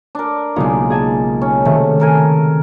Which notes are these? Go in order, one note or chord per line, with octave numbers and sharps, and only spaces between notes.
D4 A#4
B1 A#2 C#3 G#3 D#4
G#4 G#5 A5
C#4
C3 D#3 A3
A4 A#4 G#5